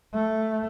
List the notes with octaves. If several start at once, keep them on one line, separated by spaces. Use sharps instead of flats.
A3